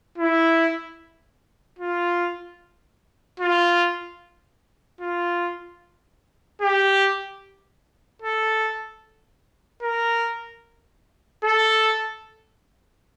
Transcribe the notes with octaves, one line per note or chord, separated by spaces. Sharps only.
E4
F4
F4
F4
G4
A4
A#4
A4